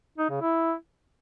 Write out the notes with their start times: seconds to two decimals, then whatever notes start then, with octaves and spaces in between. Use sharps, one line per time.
0.18 D#4
0.30 C#3
0.41 E4